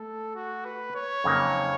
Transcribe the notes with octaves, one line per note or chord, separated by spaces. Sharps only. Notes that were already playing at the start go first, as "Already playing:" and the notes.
Already playing: A3 A4
F#4
B4
C#5
F2 C#3 F#3 A#3 D#4